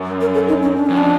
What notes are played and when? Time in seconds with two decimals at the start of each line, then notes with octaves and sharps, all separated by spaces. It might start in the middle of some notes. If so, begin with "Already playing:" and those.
Already playing: F#2
0.21 A#4
0.34 A4
0.48 D#4
0.62 C#4
0.76 D4
0.86 F2 C#4
0.97 D4